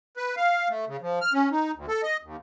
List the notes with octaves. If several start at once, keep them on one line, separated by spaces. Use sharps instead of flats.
B4
F5
A3
C#3
F3
F6
C#4
D#4
D2
A4
D#5
D#2